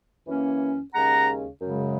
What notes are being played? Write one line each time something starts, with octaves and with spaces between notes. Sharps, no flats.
F#2 E3 A#3 C#4
D#2 C#3 G#3 C#4 F#5 A#5
F#2 C#3 G#3